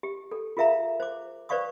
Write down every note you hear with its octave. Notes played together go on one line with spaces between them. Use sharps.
G4
A4
F4 G#4 A#4 E5 F5 A#5
C5 D6
B4 C5 D5 F5 C#6 D#6